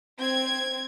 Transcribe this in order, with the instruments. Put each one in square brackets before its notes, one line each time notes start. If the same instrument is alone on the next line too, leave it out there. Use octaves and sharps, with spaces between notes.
[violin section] C4 G#6